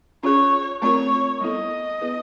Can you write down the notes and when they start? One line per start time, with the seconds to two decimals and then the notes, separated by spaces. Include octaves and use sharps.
0.23 C#4 F4 G#4 C#5
0.82 A3 C4 F4 A#4 C#5
1.41 G3 B3 E4 A4 D#5
2.01 B3 E4 G#4 B4